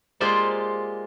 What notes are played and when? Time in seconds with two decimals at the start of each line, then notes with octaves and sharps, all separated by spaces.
0.20 G#3 A#3 F4 G4 C5 D5